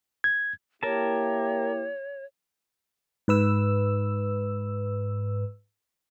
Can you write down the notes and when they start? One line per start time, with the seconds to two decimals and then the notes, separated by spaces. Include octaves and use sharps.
0.24 G#6
0.83 A#3 E4 G4 A#4 C#5 A5
3.28 G#2 B4 E6